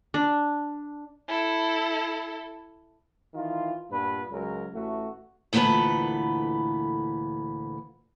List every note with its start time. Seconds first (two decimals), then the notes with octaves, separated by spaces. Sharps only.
0.14 D4
1.29 E4 A4
3.34 D#3 E3 F4
3.90 G2 A#2 B3 B4
4.31 C#2 F#3 A#4
4.73 A1 A3 F#4
5.53 D2 A#2 E3 B3 A4 B4